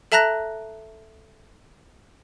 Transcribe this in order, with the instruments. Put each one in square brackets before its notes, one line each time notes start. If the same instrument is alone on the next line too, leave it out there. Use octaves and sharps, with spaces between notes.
[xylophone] A4 E5 A5 A#5 F#6 A#6